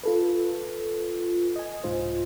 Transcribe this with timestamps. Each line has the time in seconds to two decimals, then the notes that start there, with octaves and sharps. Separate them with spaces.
0.03 F4 A4 B4
1.56 D#5 G#5
1.84 C2 G#2 F4 C5